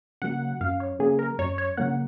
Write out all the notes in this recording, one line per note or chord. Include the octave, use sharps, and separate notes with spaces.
C#3 F#3 A#3 F#5
F#2 F5
C#5
C#3 F#3 A#3 G#4
A#4
F#2 C#5
C#5
C#3 F#3 A#3 F#5